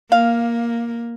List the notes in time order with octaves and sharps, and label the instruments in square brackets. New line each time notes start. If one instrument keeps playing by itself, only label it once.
[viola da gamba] A#3 [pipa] F5